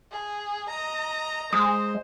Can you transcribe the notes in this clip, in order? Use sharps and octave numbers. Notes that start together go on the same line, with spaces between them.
G#4
D#5 A#5
G#3 C5 D#6